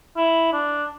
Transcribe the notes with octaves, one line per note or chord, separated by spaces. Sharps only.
E4
D4